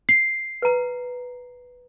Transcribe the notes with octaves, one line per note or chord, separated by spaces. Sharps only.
C7
B4 A#5